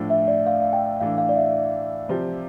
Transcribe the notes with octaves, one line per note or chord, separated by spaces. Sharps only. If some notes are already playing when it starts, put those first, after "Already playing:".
Already playing: A2 F3 A3 D4
E5
D5
F5
F5
G5
A2 E3 A3 D4 F5
F5
D5
E5
C3 F3 C4 G4